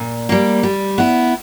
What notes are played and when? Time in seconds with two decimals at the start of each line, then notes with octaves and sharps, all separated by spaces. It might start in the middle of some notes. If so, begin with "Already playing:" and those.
Already playing: A#2
0.29 G3 A#3
0.63 G3
0.98 B3 E4